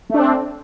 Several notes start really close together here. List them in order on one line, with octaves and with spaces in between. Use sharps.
A3 D4 C4